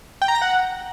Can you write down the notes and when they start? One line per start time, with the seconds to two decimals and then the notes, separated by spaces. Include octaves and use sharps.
0.22 G5
0.28 A#5
0.35 A#6
0.42 F#5